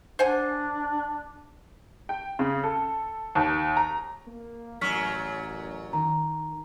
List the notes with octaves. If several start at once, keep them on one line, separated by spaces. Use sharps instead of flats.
D4 C5 F#5 G#5
G5
C#3
A4
D#2
A#5
A#3
A1 F#2 F#3 C#6 F6 B6
D#3 A#5